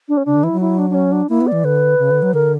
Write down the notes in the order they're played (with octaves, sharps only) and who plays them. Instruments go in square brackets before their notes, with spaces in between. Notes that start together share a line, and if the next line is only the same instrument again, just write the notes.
[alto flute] D4
C#4
[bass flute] C#3 [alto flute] D4
[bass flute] D3
[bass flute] E3 [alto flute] E4
[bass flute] F#3
[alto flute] E4
D4
D4
C#4
D4
[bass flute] A#3 [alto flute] E4
[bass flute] B3
[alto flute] D5
[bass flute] E3
[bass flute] D3 [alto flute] B4
[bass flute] C#3
D3
F#3
[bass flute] D3 [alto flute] A#4